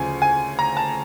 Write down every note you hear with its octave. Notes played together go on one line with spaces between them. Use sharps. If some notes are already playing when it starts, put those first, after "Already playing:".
Already playing: D2 C#3 F3 G#5
G#5
A#5
A5